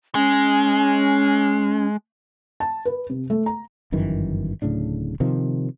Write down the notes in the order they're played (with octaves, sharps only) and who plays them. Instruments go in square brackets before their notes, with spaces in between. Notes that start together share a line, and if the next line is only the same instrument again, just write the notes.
[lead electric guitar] G#3 [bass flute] C#4
[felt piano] A5
B4
C3
A3
A#5
[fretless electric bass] G1 F#2 D#3 E3
D1 A2 C#3 D4
C3 D#3 F3